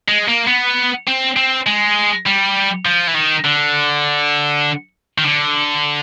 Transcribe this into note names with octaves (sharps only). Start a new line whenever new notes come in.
G#3
A#3
B3
C4
C4
G#3
G3
F3
E3
D#3
D3
D#3
D3